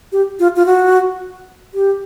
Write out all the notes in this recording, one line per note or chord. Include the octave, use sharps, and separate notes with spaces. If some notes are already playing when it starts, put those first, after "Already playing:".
G4
F4
F4
F#4
G4